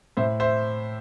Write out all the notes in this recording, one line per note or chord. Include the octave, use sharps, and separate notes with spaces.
A2 C5 E5
C5 E5